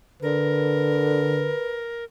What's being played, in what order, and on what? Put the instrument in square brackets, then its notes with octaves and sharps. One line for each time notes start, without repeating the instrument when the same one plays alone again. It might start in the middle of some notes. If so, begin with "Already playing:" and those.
[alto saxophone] D3 [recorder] A#4 [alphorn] B4